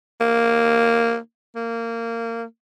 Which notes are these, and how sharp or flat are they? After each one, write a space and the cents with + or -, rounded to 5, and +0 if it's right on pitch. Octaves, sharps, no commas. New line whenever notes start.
A#3 -5
A#3 -20